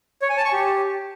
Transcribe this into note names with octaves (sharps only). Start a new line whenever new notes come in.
C#5
G#5
A5
C#6
G4